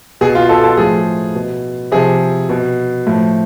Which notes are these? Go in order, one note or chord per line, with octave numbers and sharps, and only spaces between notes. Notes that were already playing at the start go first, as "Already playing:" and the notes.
B2 G#4
F4
F4 A4
F4 A4
A2 F3 G#4
B2
C3 F3 G#4
B2
A2 F3